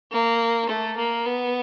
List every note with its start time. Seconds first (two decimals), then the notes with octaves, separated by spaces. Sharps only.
0.12 A#3
0.70 A3
0.97 A#3
1.26 B3